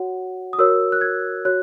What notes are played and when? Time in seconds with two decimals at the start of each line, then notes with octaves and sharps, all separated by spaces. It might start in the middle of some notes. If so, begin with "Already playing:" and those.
Already playing: F#4 C#5 F#5
0.53 D#6
0.59 F#4 A#4 C#5 E6
0.92 F#6
1.01 G#6
1.45 F#4 C#5 F#6